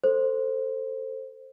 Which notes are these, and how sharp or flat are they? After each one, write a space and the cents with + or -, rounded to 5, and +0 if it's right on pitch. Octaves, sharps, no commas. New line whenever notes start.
A4 +20 C5 +5